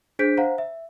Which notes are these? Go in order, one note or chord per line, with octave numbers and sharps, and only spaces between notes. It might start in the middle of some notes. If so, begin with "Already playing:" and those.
D4 G#4 C5 G6 B6 D7
C5 F5 F#5 A#5
E5